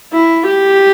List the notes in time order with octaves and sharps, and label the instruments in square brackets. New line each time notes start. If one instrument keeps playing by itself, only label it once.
[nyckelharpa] E4
G4